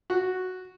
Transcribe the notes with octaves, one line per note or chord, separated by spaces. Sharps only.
F#4